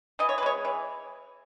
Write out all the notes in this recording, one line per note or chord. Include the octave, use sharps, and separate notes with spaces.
E3 D#5
C#5
B4
G#3 C#5
E3